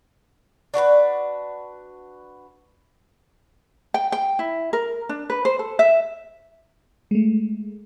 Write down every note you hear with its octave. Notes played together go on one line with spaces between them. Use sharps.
D4 F#4 A#4 B4
G5
G5
E4
A#4
D4
B4
C5
A4
E5
G#3 A3